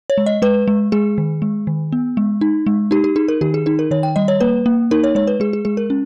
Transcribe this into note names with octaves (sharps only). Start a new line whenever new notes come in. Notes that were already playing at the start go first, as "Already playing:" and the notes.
C#5
G#3
D#5
G#3 B4
G#3
G#3 G#4
D#3
G#3
D#3
B3
G#3
D#4
G#3
D#4 G4
G4
D#4 G#4
A#4
D#3 G4
G#4
D#4 G#4
A#4
D#3 C#5
G5
G3 D#5
C#5
A#3 B4
A#3
D#4 A#4
C#5
G#3 C#5
B4
G#3 G#4
G#4
G#3 G#4
A#4
C#4